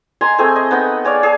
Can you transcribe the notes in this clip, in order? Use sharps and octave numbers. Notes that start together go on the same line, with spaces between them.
D#5 G#5 A#5 C6
A3 C4 G#4 G#5
D#5
B3 D#4 F#5 G5
G#4 C#5 D5 F5
G#4 A5